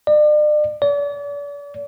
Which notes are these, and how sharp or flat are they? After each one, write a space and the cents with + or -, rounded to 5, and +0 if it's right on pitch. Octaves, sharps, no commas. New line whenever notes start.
D5 +40
D5 -40